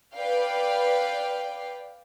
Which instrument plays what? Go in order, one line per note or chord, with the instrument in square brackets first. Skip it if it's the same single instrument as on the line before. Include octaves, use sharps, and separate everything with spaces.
[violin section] B4 D5 F5 G5